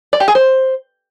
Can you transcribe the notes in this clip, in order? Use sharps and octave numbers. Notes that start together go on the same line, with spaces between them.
D5
G4
G#4
C5